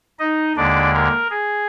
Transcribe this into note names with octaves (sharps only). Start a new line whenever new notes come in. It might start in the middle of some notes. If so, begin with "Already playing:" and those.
D#4 D#5
D#2 D3 G#3 D4 D5
A#4
G#4